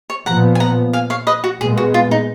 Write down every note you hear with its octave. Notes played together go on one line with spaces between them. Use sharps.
C#5
A#2 F3 B3 F#5 A#5
G#5
F#5 A#5
F5 G#5
C#5 F5
B4 D#5
F#4
A#2 G#3 B3 G#4
F#4
F4
D#4